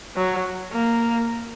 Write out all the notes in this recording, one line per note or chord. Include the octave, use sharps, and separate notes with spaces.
F#3
A#3